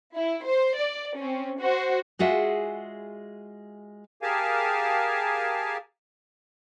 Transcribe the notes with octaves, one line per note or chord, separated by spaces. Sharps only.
E4
C5
D5
C4 C#4
F#4 C5
G#3 F4 F#4 G#4 E5
G4 G#4 A#4 F5 G#5 A5